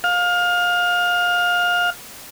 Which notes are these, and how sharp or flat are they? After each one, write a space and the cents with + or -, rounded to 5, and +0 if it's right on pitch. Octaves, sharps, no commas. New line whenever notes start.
F5 +25